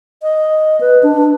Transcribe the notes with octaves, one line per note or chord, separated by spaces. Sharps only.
D#5
B4
D4